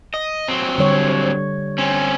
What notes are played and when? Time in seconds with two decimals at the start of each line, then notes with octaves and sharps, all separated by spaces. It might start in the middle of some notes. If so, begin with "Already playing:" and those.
0.14 D#5
0.48 F#3 C4
0.78 D3 G3 C#5
1.78 C4 C#4